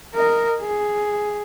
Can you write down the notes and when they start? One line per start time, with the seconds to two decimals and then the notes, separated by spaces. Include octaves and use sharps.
0.14 A#4 D#5
0.61 G#4